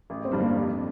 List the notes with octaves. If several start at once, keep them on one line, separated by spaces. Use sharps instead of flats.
A1
C4
G2 D3 G3 D4
A#3
F2